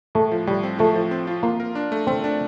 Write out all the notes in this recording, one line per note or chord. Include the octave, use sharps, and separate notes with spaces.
A2 A3
F3
A2 G3
C4
F3 A3
F3
C4
F4
A#3 F4
A#4
D4
A3
A3 C4
D4